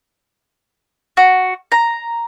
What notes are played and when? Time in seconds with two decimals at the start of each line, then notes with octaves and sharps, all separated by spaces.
1.17 F#4
1.72 A#5